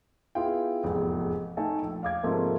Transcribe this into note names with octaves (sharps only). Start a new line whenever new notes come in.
B3 E4 F4 G#4 F5 G5
F1 E2 G#2
A3 D#4 A4 G5 G#5
A#1
F5 D6 G#6
G#2 C3 F3 A3 A#3